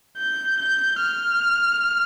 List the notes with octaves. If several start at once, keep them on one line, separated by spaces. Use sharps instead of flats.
G6
G6
F6